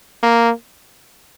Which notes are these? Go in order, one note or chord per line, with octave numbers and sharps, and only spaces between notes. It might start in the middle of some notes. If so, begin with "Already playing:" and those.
A#3